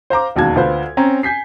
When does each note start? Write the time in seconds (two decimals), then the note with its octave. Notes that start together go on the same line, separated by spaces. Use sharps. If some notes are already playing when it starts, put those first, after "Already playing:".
0.10 C5 F5 A#5 D6
0.36 E1 D#2 F#4 A5 G#6
0.56 D2 F4 B4 C5
0.97 C4 C#4 A#5
1.23 G#5 G6 B6 C7